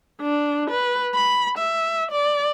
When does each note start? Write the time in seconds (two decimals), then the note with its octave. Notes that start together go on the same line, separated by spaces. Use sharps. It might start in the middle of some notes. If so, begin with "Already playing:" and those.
0.21 D4
0.70 B4
1.15 B5
1.58 E5
2.12 D5